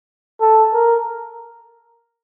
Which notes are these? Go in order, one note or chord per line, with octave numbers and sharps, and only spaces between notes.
A4
A#4